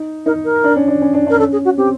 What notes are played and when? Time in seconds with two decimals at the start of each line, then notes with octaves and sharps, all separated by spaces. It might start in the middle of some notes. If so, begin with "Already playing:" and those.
Already playing: D#4
0.26 D#4 A#4
0.45 A#4
0.64 D4
0.76 C#4
0.88 D4
1.02 C#4
1.14 D4
1.27 D4 A#4
1.39 C#4 A4
1.52 G#4
1.65 F#4
1.77 C4 G4